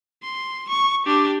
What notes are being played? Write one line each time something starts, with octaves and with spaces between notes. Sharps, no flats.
C6
C#6
D4 G4